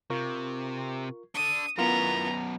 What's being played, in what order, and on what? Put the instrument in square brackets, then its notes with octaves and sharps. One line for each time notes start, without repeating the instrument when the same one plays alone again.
[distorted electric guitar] C3 [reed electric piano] F4 A#4 C#6
[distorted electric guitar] D4 A4 [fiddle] D#6
[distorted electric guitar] F#2 B2 [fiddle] B3 [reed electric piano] E4 F4 A#4 [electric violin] A#5